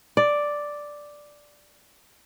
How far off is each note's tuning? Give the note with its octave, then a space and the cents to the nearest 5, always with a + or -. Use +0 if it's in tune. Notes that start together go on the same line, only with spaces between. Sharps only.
D5 +0